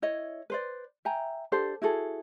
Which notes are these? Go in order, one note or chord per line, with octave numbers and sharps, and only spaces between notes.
E4 C#5 D#5
B4 C5 D5
E5 G5 G#5 A#5
D4 G4 A4 C5
E4 F#4 G#4 A4